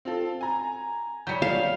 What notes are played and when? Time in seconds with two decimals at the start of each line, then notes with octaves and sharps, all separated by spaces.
0.05 C4 F4 A4
0.41 G#5 A#5
1.27 F#3 G3 C#5 G6 B6 C#7
1.42 F5